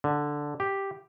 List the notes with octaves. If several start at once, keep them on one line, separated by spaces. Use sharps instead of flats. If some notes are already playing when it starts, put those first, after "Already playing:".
D3
G4